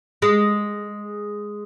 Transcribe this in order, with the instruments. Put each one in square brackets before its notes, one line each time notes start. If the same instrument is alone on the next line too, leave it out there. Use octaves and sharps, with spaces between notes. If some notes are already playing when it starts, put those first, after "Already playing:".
[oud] G#3